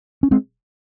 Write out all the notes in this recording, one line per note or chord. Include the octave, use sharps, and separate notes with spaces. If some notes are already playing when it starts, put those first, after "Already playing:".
C#4
G#3 C4